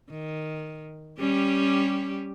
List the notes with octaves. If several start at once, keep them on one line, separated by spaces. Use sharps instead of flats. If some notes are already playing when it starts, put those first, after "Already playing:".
D#3
G3 C#4 G4